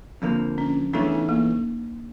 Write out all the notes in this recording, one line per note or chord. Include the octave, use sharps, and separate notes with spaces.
F2 D3 F3 A#3
C#4
E2 C#3 E3 A3 C#4 D4
D#4
A#3